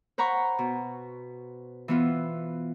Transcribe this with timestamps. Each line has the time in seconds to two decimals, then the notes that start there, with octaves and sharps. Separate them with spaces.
0.18 C5 F#5 A#5 B5 C#6
0.59 B2
1.88 E3 B3 F4